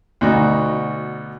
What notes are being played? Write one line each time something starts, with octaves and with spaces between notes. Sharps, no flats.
D2 B2 D#4 F#4